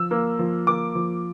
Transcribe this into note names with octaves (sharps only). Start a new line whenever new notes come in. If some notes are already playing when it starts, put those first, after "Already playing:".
Already playing: F3 E6
A#3
F3
A#3 D6
F3